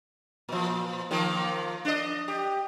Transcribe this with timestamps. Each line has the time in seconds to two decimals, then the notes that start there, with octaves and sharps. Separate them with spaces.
0.49 A#2 F3
1.11 D#3 F3 A#3
1.85 D4 D#5
2.28 G4